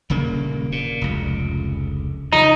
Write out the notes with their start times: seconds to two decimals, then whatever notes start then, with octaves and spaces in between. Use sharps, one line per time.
0.10 D#1 C#3 A#3
0.72 A#2
1.01 F1 C#2
2.33 C#3 F3 D#4